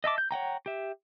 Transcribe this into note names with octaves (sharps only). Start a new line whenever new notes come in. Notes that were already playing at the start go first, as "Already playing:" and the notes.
D#5 E5 A5 D6
G6
C#5 F#5 G5 A#5
G4 E5